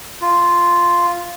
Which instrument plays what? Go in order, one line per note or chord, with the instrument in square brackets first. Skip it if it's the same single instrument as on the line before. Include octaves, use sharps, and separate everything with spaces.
[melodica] F4